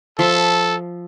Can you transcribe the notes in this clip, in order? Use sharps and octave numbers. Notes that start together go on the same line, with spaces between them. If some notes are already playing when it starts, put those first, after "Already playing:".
F3 A4 E5 C6